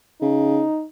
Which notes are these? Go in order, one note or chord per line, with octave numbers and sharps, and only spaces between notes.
C#3 D#4